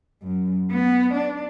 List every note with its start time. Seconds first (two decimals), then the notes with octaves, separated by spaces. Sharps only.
0.22 F#2
0.71 B3
1.14 D4